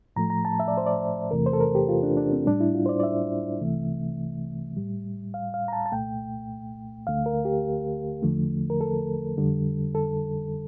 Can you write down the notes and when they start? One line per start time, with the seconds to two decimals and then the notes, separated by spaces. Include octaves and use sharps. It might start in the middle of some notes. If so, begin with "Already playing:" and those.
0.16 A2 F3 A3 A#5
0.30 A#5
0.45 A5
0.60 E5
0.68 D5
0.78 C5
0.86 D5
1.31 E2 C3 E3 A3 A#4
1.46 C5
1.53 A4
1.60 A#4
1.75 G4
1.89 F4
2.03 D4
2.17 D4
2.32 C4
2.46 A2 G3 D4
2.60 E4
2.75 F4
2.86 C5
2.89 D5
3.00 D5
3.03 E5
3.61 C2 C3 E3 A3
4.77 A2 G3
5.34 F5
5.54 F5
5.68 A#5
5.73 A5
5.86 A5
5.92 C2 A#2 A3 G5
7.07 D2 D3 A3 F5
7.26 A#4
7.45 G4
8.23 E2 D3 F3 A3
8.70 A#4
8.81 A4
9.37 F2 D3 G3
9.95 A4